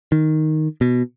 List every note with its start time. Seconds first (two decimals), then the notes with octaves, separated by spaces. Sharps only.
0.12 D#3
0.81 B2